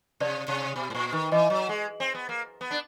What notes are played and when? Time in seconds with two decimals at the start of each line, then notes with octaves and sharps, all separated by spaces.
0.20 C3 D5
0.48 C3
0.76 B2
0.90 A2
0.95 A#2
1.12 D#3
1.32 E3 D#5
1.50 F#3
1.69 G#3
2.00 C4
2.14 B3
2.29 A#3
2.61 B3
2.71 D4